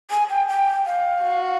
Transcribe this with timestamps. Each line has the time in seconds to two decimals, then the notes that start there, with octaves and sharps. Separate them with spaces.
0.10 G#5
0.30 G5
0.48 G5
0.86 F5
1.24 F#4